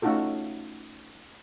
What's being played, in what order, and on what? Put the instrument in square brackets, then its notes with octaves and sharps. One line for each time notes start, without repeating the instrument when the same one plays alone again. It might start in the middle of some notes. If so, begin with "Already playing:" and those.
[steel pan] A3 C#4 D#4 F4 F#4 A4